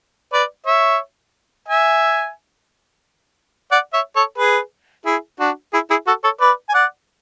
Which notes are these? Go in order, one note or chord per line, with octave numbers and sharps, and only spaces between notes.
B4 D5
C#5 E5
E5 G#5
D5 F#5
C#5 E5
A4 C#5
G#4 B4
E4 G#4
D4 F#4
E4 G#4
E4 G#4
F#4 A4
A4 C#5
B4 D5
G#5
D5 F#5